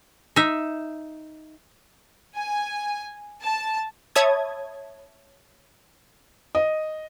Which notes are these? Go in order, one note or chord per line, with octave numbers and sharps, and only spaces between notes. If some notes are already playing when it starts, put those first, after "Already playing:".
D#4 E5
G#5
A5
C#5 E5 A5 B5 D#6 G#6
D#5